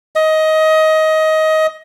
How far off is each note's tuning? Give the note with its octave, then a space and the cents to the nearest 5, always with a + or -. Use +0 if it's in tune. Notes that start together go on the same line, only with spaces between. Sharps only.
D#5 +20